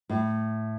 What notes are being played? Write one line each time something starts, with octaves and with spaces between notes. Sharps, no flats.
A2